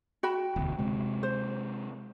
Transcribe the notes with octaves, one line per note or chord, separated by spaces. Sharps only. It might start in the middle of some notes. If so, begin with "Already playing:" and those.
F#4 G5 B5
E1 D2
C3 G#3
C5